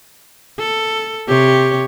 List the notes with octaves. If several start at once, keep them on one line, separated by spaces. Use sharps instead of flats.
A4
C3 G4 C#5